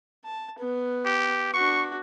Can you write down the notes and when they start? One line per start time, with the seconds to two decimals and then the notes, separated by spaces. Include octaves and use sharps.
0.24 A5
0.59 B3
1.05 G4
1.53 D4 F#4 C#6